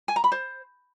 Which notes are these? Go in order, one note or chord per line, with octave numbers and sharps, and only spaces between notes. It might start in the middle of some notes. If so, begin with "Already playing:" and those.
G#5
A#5
B5
C5